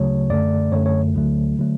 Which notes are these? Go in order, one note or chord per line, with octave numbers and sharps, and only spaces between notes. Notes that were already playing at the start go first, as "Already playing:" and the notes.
Already playing: D2 C#3 F#3 A3 C#5
F#2 D3 A3 D5
F#2 D3 A3 C#5
C#5
D2 D3 F#3 A3
D3 F#3 A3